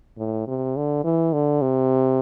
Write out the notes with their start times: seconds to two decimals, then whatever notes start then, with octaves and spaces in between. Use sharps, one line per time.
0.18 A2
0.48 C3
0.76 D3
1.04 E3
1.33 D3
1.62 C3